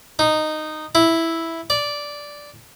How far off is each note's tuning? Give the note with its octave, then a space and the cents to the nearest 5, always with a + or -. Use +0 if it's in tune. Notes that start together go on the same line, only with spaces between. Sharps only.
D#4 -10
E4 -5
D5 -10